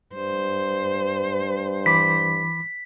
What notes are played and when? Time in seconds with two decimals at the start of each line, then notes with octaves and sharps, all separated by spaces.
0.15 G2 C5
1.86 E3 B5 D6 B6